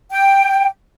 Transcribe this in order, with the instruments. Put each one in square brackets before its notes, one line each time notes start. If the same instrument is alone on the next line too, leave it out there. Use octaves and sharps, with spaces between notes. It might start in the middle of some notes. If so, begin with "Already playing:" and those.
[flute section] G5